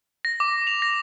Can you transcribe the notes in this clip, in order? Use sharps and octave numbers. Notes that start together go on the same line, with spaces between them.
A#6
D6
F7
A#6